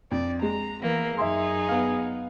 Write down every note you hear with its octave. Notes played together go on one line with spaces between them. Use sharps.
F2 D5
G#3 A#5
E3 A#3 B3
F#2 D#4 G#4 E5 C6
B3 F5